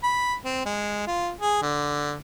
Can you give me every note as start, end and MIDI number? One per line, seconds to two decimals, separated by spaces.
0.03 0.34 83
0.45 0.64 60
0.66 1.07 56
1.07 1.30 65
1.41 1.61 68
1.62 2.15 50